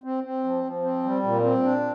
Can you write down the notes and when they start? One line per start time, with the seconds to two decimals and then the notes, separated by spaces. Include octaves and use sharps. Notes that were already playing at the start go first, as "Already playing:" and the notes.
0.04 C4
0.24 C4
0.44 F3
0.64 F3
0.84 C4
1.03 G3
1.23 A#2
1.43 C4
1.63 D4